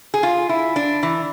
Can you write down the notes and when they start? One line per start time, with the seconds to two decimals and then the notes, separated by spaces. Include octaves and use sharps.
0.14 G#4
0.23 F4
0.49 E4
0.76 D4
1.03 E3